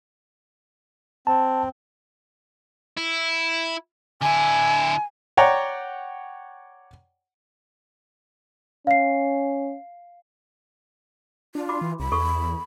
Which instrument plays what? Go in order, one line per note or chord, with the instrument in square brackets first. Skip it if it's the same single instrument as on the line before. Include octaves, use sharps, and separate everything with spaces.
[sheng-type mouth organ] C4 [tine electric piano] A5
[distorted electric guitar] E4
[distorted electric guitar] D3 E4 [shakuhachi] G#5
[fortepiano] C#5 D5 F#5 G5 A#5
[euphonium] C#4 [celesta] F5 C7
[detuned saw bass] D4 [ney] F4
[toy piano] F#4 B5 D6
[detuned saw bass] E3
[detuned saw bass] C2 [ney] B5
[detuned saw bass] E2 [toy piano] A4 C#6 D#6